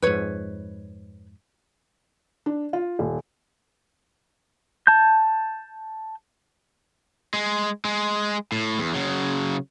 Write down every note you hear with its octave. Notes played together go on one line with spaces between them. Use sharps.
F2 G#2 B4 C#5
D4
F4
D#1
A5 G6
G#3
G#3
A2
E2
C#3 F#3